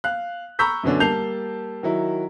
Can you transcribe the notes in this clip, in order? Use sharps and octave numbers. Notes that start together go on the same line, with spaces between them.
F5 F#6
A#5 B5 C#6 E6 G6 B6
F#2 B2 D3 C#4 D4
G3 A#3 A5 G6 C7 F7
D#3 F#3 E4